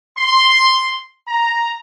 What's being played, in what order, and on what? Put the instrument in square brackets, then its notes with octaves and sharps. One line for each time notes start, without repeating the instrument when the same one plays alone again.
[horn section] C6
A#5